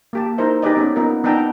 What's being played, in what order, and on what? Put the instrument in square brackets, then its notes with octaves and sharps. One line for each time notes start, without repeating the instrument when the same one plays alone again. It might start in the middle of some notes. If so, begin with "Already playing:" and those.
[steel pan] A#3 G4 A5
D#4 E4 A#4 C5 E5
D#4 G4 G#4 B4 D5 D#5
B3 C#4 D#4
B3 D#4 F4 A#4
B3 D4 D#4 G5 A5 A#5